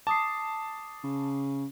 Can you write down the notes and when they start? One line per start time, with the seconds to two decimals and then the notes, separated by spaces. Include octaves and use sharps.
0.07 A5 D6 D#6 C7
1.04 C#3